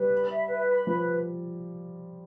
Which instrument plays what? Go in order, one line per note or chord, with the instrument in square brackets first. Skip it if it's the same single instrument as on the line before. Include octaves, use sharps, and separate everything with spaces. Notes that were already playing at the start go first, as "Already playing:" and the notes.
Already playing: [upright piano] G3 [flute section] B4
[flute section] B5
E5
B4
B5
[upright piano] F3 [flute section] B4